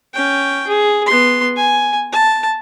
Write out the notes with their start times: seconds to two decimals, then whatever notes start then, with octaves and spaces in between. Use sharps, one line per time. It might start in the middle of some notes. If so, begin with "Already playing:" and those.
0.14 C#4 G5
0.67 G#4
1.06 B3 C6
1.56 G#5
2.12 A5